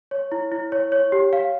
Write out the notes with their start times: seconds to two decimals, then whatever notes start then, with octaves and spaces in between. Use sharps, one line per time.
0.11 C#5
0.32 E4
0.52 E4
0.72 C#5
0.92 C#5
1.12 G4
1.33 F5